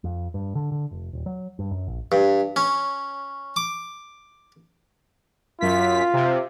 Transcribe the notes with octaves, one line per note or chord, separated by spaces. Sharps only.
F2
G2
D3
D3
F1
D#1
F#3
G2
F#2
A#1
G2
C#4
D6
F#2 F4 B6
C3